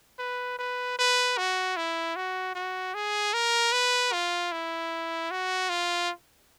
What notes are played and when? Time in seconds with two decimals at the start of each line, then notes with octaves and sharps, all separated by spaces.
0.19 B4
0.59 B4
0.99 B4
1.38 F#4
1.77 E4
2.16 F#4
2.55 F#4
2.94 G#4
3.33 A#4
3.73 B4
4.13 F4
4.52 E4
5.31 F#4
5.70 F4